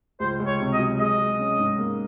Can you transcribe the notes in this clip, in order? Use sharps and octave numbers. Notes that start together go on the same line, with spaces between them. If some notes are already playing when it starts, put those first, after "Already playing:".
C#2 C5
C#2
C#5
C3
D#5
F#3
G#3 D#5
G#3
C#4
G#2
A#3